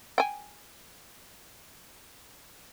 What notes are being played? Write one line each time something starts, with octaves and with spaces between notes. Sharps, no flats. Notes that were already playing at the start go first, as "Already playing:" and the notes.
G5 G#5